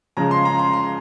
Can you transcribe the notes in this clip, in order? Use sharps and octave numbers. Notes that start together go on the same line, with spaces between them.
C#3 F3 G#3 A#5
C6
A#5
C6
C6